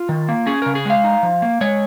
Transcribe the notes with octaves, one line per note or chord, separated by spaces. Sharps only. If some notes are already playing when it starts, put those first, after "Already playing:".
Already playing: F4
D#3
A#3
C#4 G#4
C#3 A#4
G#4
G#3 F5
D#4
F3
A#3
G#3 C#5